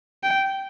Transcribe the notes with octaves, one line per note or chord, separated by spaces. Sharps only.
G5